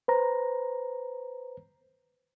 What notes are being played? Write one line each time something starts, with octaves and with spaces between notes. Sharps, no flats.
B4 C5 A#5